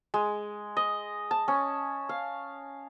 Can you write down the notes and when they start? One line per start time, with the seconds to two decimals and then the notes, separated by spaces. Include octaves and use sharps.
0.14 G#3
0.77 D#5
1.31 A5
1.48 C#4
2.09 F5